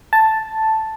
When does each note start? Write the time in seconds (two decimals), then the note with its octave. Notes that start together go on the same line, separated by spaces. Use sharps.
0.13 A5